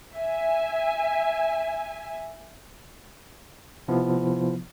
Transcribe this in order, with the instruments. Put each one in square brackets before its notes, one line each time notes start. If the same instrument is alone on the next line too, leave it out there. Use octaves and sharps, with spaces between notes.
[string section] E5 G#5
[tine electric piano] C3 F3 B3 E4